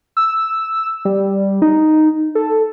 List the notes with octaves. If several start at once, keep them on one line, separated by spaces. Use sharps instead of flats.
E6
G3
D#4
A4